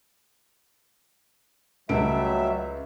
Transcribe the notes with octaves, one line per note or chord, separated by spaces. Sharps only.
C#2 F#3 G3 A3 E5 D7